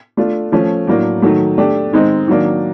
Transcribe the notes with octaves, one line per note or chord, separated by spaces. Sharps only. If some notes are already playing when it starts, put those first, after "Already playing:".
A3 D4 F4
F3 A3 C#4
A2 F#3 A#3 D4
D#3 F#3 A3
A3 D4 G4
D#3 G#3 C4 D#4
D#3 F#3 A#3 D4